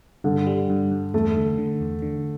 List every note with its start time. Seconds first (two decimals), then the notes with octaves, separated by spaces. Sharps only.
0.24 G2 D3
0.47 G3
0.70 G2
0.91 G2
1.13 E2 A3
1.36 D3
1.58 D3
1.81 E2
2.02 D3